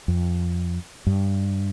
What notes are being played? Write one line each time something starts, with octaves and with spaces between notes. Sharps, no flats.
F2
G2